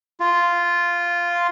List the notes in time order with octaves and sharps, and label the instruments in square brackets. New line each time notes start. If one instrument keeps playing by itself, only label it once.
[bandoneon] F4